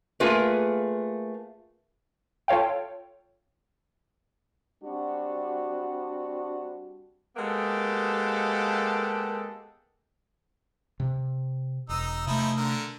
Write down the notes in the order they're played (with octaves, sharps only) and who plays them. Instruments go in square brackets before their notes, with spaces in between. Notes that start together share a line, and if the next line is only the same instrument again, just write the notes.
[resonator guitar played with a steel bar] A3 A#3 F4 G#4 A#4 B4
[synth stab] F4 A4 C#5 F5 G5
[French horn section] G3 C4 D4 F#4
[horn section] G#3 A#3 B3 G4 A4
[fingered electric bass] C3
[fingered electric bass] E1 [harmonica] D#4 E6
[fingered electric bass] C3 A3 [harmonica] F3 D#4 E4
[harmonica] D3 A#4